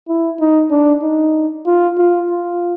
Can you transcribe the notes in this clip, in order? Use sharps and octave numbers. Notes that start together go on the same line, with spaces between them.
E4
D#4
D4
D#4
F4
F4
F4